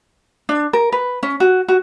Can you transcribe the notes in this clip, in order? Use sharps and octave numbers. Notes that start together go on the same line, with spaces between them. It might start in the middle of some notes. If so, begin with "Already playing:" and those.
D4
A#4
B4
C#4
F#4
F#4